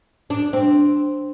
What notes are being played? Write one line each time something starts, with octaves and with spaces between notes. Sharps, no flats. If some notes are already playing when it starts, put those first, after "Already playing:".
D4
C4